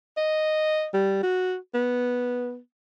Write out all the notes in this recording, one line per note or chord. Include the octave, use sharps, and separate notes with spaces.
D#5
G3
F#4
B3